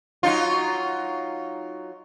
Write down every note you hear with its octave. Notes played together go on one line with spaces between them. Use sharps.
F#3 D#4 F4